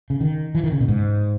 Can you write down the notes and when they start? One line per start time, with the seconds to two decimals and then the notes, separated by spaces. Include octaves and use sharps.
0.10 C#3
0.21 D#3
0.55 E3
0.64 D#3
0.72 C#3
0.81 B2
0.88 G#2